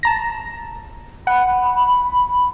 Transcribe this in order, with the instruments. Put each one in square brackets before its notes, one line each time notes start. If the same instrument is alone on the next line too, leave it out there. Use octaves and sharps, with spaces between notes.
[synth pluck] A5 A#5 A#6
[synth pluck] F#5 [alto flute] B5